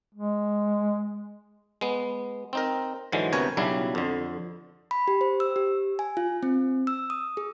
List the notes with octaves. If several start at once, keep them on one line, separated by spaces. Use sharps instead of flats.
G#3
G#3 B3
C4 D#4 A#4
G#2 D3 E3 F#3 G#3
D2 C3 B3 A#4 C#5 G#5
B1 C#3 F#3 G3 D4 E4
F2 D3
B5
G4
C5
E6
G4
G#5
F4
C4
E6
D#6
G#4